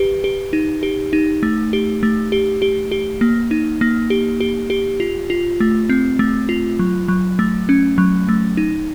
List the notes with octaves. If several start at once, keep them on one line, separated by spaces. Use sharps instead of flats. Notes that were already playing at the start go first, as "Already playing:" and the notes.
Already playing: G4 B4
G4
D#4
G4
D#4
A3
G4
A3
G4
G4
G4
A#3
D#4
A#3
G4
G4
G4
F4
F4
A3
C4
A3
F4
F#3
F#3
A3
C#4
F#3
A3
D#4